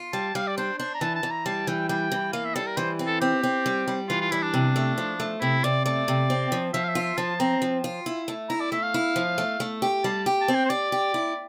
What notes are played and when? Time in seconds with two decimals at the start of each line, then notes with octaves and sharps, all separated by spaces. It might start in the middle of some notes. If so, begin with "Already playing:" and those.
Already playing: F4
0.13 G3 A5
0.35 G3 F5
0.47 D5
0.57 D4 C5
0.79 D4 C5
0.95 A#5
1.01 E3 A5
1.16 A5
1.23 E3
1.31 A#5
1.46 G3 A5
1.67 E3 G5
1.89 G3 G5
2.12 E3
2.33 A#3 F5
2.45 E5
2.55 G3 A4
2.67 A#4
2.77 E3 C5
2.99 C4
3.07 A4
3.21 C4 G4
3.43 C4
3.66 G3
3.88 G3
4.09 E3 F4
4.21 F4
4.31 G3 E4
4.43 D4
4.54 C3
4.76 A3
4.98 F3
5.20 A3
5.41 C3 E4
5.64 C3 D5
5.85 A3 D5
6.08 C3
6.30 C4
6.52 F3
6.74 F3 E5
6.84 F5
6.89 E5
6.95 F4
7.03 E5
7.17 F3 A5
7.40 C4 A#5
7.62 F3
7.84 F4
8.06 E4
8.28 A3
8.49 E4 A#5
8.61 D5
8.72 A3 E5
8.83 F5
8.94 E4
9.16 F3
9.38 A3
9.60 A3
9.82 G4
10.04 G3 A5
10.26 G4
10.41 A5
10.48 C4
10.55 G5
10.65 C5
10.70 G4 D5
10.92 G4
11.14 E4